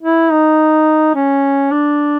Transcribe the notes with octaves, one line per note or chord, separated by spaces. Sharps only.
E4
D#4
C#4
D4